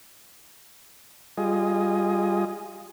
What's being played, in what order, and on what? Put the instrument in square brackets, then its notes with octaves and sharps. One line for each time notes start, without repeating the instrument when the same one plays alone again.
[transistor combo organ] G3 F4 G#4 D#5